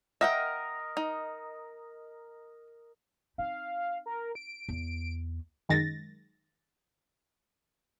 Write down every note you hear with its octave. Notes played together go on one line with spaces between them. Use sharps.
A#4 D#5 E5 F#5 G5
D#4
C4 D#4 F5
A#4
D7
E2
F#2 D#3 G#3 A6 A#6